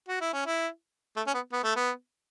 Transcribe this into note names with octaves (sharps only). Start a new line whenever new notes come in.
F#4
E4
C#4
E4
A3
C#4
B3
B3
A3
B3